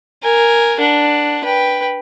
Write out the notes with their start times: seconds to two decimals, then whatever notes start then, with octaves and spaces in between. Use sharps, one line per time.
0.23 A#4 G#5
0.80 D4 F#5
1.44 B4 G5